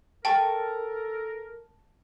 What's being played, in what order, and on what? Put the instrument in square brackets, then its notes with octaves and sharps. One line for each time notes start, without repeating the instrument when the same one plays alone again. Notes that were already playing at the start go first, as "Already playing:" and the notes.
[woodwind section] A4 A#4 [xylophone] G5 [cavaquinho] A5 C#6